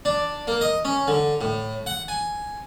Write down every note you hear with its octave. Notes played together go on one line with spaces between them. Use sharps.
D4
A#3
D#5
C#4
D3
A2
F#5
G#5